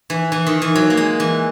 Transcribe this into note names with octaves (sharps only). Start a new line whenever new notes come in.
E3
E3
D#3
E3
F#3
A#3
G#3
E3